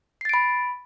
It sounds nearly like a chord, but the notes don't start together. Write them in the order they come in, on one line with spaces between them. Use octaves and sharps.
C7 A6 D7 B5